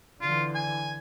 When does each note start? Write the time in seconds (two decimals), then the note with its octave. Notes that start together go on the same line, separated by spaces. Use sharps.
0.21 D3 E3 F4
0.55 G#5